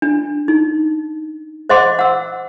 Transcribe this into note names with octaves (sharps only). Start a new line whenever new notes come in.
D4
D#4
C5 D#5 F#5 C6 D6
F#5 E6